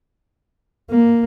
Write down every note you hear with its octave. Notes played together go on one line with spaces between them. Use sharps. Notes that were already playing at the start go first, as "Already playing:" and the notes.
A#3